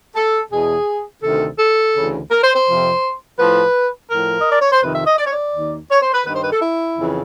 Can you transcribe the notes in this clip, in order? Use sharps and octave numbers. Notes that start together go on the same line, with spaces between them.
A4
E2 B2 G#4
D2 C3 D#3 A4
A4
D2 C#3 E3
A#4
C5
C5
F2 C3 F3
A2 F3 B4
A2 F3 A#4
D#5
D5
C#5
C5
F2 C3 D#3 B4
E5
D#5
D5
C#5
D5
D#2 D#3
C#5
C5
B4
G2 D#3 B4
C5
B4
A4
E4
F2 C#3 E3